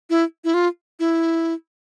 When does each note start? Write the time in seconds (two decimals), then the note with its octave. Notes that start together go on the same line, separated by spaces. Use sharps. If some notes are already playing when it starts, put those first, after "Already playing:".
0.10 E4
0.44 E4
0.54 F4
1.00 E4